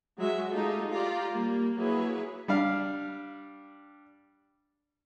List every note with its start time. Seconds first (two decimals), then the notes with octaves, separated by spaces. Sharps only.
0.18 F#3 G#3 F#4 E5
0.51 G#3 A3 D#4 F4 G4 A4
0.90 F4 G4 D5 A#5
1.30 G3 A#3
1.76 F#3 A#3 E4 G#4 B4 C#5
2.48 G3 D4 F5 F6